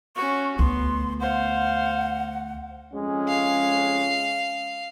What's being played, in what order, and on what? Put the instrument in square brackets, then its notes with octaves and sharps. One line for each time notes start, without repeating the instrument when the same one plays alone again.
[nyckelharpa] C#4 F#4 [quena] C#6
[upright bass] D2 [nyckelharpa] B3 [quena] C6
[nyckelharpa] C5 F5 [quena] F#5
[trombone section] F2 G#3 C#4
[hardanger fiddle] F5